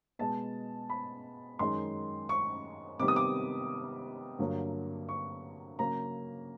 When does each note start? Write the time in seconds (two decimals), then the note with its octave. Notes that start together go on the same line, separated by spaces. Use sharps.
0.19 B2 G#3 B3 A5
0.90 B5
1.59 F#2 D#3 G#3 C6
2.29 C#6
2.99 C3 D#3 G3 B3 D6
3.08 D#6
3.16 D6
4.39 G2 D3 F#3 A#3
5.09 C#6
5.79 C#3 F#3 A#3 A#5